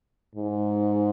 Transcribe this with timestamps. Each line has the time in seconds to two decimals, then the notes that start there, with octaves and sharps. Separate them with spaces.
0.36 G#2